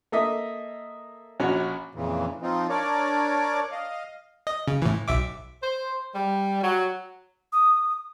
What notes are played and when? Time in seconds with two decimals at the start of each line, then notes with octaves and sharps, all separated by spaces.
0.12 A#3 A4 D#5 E5
1.40 A#1 C#4 F#4
1.95 F2 A#2 C#3 E3
2.42 F3 C4 D#4 F4
2.69 D4 A#4 C#5 D5 D6
3.72 D#5 F5
4.47 D#5
4.67 C#3
4.82 A2 E3
5.08 B1 E5 D6
5.63 C5
6.15 G3
6.63 F#3
7.53 D#6